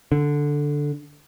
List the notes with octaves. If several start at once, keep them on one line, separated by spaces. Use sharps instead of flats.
D3